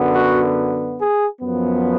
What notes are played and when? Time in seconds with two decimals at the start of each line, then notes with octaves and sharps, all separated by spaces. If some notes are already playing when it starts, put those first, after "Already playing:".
Already playing: F#2 D3 F#3 B3
0.13 F#4
0.98 G#4
1.40 F#2 F3 B3